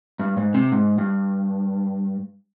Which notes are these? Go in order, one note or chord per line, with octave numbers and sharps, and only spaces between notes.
G2
G#2
C3
G#2
G2